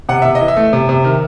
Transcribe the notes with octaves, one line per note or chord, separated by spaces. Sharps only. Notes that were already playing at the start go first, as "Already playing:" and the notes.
C3 F#5
C3 E5
D#5
E3
E5
A3
C3
C3
D#3